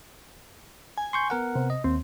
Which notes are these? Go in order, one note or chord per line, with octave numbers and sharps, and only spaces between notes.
G#5
C6 C#6 G6
B3 A#4 F#5
C3
D#5
D#2 C4